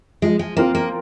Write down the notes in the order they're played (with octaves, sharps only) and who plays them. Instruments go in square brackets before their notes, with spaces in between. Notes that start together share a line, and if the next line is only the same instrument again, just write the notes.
[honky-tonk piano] F3 [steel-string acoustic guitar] G#3
[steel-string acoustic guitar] G#3
[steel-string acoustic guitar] A#3 [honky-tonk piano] C4 F4 A#4
[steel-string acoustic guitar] A#3